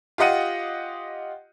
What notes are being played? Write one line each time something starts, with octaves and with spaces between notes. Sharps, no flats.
F4 G4 D#5 F#5 D#7